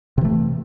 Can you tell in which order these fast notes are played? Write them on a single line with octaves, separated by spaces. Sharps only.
C3 E3 A3